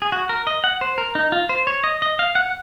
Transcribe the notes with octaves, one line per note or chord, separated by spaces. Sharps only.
G#4
F#4
A#4
D#5
F#5
C5
A#4
D#4
F4
C5
C#5
D#5
D#5
F5
F#5